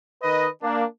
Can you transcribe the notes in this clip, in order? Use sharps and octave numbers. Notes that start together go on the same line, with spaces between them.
D#3 B4 D#5
A#3 D4